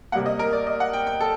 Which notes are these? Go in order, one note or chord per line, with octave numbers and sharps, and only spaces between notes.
C3 G3 A#3 F#5
D#5
A#4
D5
D#5
F#5
G5
G5
A4